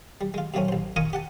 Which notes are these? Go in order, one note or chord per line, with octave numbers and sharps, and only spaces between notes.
G3
G#3 F4
F#2 A#2 F#3 A3 C4 C#4
A1 C5
F4 A#4 D#5 G#5 C#6 D#6
G4 F#5 A5